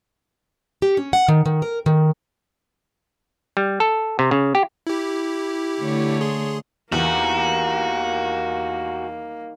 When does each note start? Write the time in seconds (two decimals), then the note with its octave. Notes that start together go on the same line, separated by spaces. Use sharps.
0.82 G4
0.97 C#4
1.13 F#5
1.28 D#3
1.46 D#3
1.62 A#4
1.86 D#3
3.57 G3
3.80 A4
4.19 C3
4.31 C#3
4.55 G4
4.87 E4 G4
5.81 D3 A3 C#5
6.21 G#4 C6
6.92 E2 D#3 G3 A#3 D#4 F#4